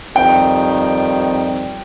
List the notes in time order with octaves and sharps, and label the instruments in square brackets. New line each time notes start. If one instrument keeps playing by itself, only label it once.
[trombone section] F2 D#3 G3 [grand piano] G5